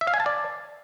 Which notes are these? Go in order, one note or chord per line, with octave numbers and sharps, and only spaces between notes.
E5
F5
G#5
A5
D5